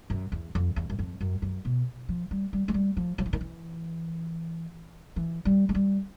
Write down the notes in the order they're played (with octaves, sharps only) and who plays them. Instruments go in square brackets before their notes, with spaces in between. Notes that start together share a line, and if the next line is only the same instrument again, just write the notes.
[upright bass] F#2
E2
F2
E2
F#2
F2
F#2
F#2
B2
F3
G3
G3
G#3
G3
F3
F3
E3
D#3
E3
E3
G3
G#3
G3